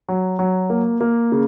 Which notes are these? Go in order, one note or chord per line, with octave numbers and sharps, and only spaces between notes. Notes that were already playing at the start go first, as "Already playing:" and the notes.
F#3
F#3
A#3
A#3
C#3